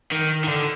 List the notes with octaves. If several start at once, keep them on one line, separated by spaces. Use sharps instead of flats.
D#3
D#3
D3